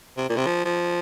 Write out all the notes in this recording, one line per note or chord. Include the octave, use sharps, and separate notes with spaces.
C3
A#2
C3
F3
F3